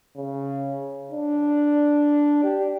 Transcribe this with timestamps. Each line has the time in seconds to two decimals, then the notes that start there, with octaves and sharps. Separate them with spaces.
0.17 C#3
1.11 D4
2.44 G4